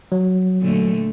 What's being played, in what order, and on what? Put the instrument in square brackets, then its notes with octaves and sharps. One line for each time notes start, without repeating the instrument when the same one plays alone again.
[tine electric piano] F#3
[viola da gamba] A#2 D3 A3